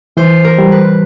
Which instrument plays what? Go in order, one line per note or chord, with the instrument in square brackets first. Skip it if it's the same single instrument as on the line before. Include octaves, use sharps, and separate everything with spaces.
[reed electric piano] E3 [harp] C5
[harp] A#4
[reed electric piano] G3
[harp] B4